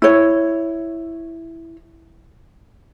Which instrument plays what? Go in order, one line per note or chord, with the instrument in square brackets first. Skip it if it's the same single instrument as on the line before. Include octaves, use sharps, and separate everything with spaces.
[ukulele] E4 C#5